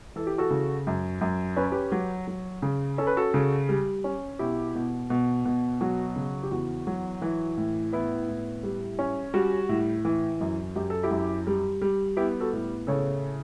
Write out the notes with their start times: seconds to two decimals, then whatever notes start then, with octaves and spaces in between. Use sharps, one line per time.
0.16 E3 A4
0.27 G4
0.38 F#4 A4
0.50 C#3
0.87 F#2
1.21 F#2
1.57 C#4 B4
1.64 C#5
1.72 G4 B4
1.92 F#3
2.28 F#3
2.62 C#3
2.98 C#4 A4
3.07 B4
3.17 F#4 A4
3.34 C#3
3.69 G3
4.04 C#4
4.39 B2 E4 G4
4.75 B2
5.10 B2
5.45 B2
5.81 F#3 F#4
6.16 C#3
6.43 G4
6.51 E2 F#4
6.87 F#3
7.22 E3
7.57 A2
7.93 B3 E4
8.28 A2
8.63 G3
8.99 C#4
9.34 G3 F#4
9.69 A2
10.05 E3
10.41 F#2
10.76 F#2 G4
10.90 A4
11.03 E4 G4
11.11 F#2
11.47 G3
11.82 G3
12.17 B3 E4 G4
12.40 F#4 A4
12.53 A2
12.87 C#3 A4 C#5